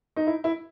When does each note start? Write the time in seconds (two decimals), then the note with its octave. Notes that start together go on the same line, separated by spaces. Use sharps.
0.16 D#4
0.27 E4
0.44 E4